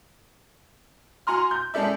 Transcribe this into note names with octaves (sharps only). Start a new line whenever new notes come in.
F#4 G#5 A#5 C6 F6
G6
G#3 C#4 A4 D5 E5